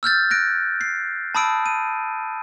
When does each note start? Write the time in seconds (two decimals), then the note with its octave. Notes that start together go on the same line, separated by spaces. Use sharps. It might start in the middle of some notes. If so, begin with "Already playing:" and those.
0.03 E6 F6 G6 A6
0.31 F#6 A#6 D7
0.81 C7
1.35 A5 B5 D#6 E6 D7
1.66 D#7